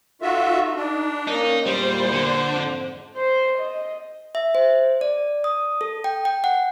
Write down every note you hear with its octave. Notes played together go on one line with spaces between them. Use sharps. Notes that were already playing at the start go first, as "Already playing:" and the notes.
D#4 F4 F#4 A4 E5
D4 D#4
A#3 C#4 D#4 A#4
E2 A#2 G3 C5
D3
F2 G#2
C5
D#5
E5
C5
D5
D#6
A4
G5
G5
F#5